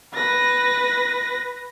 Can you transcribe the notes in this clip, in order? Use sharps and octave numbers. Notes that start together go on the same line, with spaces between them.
B4 A#6